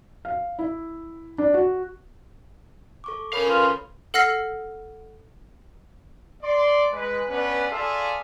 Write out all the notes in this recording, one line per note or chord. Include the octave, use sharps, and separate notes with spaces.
F5
E4
D4
F#4
A4 C#6 D6
C#4 A4 A#4 C#5 F5 B5
F4 B4
A4 F#5 E6 F6 A#6 C7
D5 C6
G#3 B4
B3 C#4 D4 B4
F4 G#4 A4 D5 E5 F5